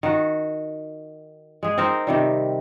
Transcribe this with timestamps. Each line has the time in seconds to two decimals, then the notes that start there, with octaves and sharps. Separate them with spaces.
0.03 D#3 F#4
1.63 G#3 G#4
1.78 C4 D#4 A#4 C5
2.07 C3 D#3 G3